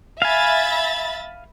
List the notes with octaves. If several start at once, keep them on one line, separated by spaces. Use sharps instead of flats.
E5 F5 G#5 B5 A6